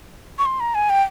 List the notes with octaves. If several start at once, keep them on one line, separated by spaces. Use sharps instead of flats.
C#6
C6
A#5
G#5
G5